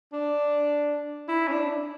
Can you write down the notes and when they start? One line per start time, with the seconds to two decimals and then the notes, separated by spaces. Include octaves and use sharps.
0.13 D4
1.29 E4
1.48 C#4
1.52 D4